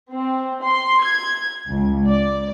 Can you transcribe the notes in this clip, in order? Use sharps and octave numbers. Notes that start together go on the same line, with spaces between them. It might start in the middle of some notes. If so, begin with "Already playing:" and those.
C4
C6
G#6
C#2
D5